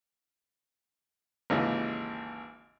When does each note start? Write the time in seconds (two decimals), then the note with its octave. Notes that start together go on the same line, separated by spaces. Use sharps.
1.50 G#1 D#2 C#3 E3